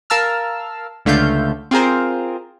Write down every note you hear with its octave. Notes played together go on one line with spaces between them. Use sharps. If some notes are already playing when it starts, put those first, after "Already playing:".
A#4 F5 A5 E6 F6
C#2 D3 A3 F5 G6
C4 F4 G#4 A#4 C5